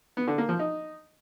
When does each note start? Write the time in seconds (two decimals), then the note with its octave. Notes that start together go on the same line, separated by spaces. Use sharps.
0.17 B3
0.28 D3
0.38 A#3
0.49 F3
0.59 D#4